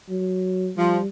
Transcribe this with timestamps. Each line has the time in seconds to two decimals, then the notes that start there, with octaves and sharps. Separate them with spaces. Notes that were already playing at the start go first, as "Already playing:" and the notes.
0.09 F#3
0.77 F3 G3